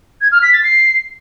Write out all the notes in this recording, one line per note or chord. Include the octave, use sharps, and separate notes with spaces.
G#6
F6
B6
A6
C7